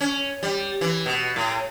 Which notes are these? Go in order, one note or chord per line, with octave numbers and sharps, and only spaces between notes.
C#4
G3
E3
B2
A2